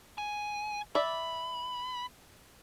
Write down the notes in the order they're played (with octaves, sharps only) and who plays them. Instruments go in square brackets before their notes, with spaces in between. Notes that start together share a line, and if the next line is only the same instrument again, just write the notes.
[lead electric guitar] G#5
[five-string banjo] D5 E5 [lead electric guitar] B5